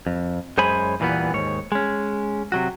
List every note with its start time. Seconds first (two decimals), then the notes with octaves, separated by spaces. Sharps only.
0.07 F2
0.58 F#2 G#3 C5 C#5 G#5 B5
1.00 E2 A#2 E3 G3 B3
1.34 D#2 G#2 C#5
1.72 G#3 C#4
2.52 C3 F#3 F#4